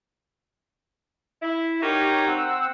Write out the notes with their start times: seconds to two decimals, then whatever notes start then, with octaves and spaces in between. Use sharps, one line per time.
1.42 E4
1.82 D#4 F#4 G4 A#4 C#5
2.27 C4 F#5 E6